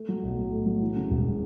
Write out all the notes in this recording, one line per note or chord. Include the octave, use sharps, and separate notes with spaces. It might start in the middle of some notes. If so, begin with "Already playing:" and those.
Already playing: A3
F#3
B1
A2
A3
F#3
E3
C#3
E1